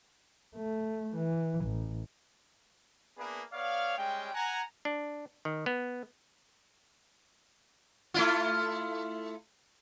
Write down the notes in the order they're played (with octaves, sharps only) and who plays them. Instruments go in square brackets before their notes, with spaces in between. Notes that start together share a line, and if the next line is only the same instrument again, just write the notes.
[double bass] A3
E3
A1
[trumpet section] A#3 B3 D4 E4 G#4 B4
B3 C#5 D5 F5
G3 G#3 C#4 G5
F#5 G#5 A#5
[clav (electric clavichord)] D4
D#3
B3
[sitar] A3 E4 F4